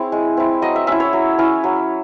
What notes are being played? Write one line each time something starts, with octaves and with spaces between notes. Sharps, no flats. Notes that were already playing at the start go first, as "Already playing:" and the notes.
Already playing: C4 E4 G#4 C#5
G#3
C4 E4
F#3 D#5
E5
C#4 E4 E5
C#5
F#3
C#4 E4
F#3